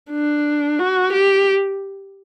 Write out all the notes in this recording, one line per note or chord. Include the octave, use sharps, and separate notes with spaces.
D4
F#4
G4